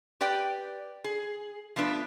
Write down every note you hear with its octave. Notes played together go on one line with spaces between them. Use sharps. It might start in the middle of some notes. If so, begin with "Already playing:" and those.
G4 B4 D5 G5
G#4
F3 A3 B3 D4 B4